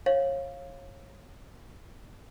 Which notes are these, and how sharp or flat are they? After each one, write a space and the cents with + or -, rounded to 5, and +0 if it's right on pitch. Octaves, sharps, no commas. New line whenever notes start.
C#5 -25 F5 +0